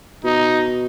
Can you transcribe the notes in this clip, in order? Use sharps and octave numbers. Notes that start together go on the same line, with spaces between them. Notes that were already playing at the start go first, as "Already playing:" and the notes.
B2 D#4